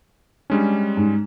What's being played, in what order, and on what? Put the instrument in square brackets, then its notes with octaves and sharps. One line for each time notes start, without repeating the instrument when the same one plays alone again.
[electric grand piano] G3 G#3 C#4 [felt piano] D4
[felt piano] G#2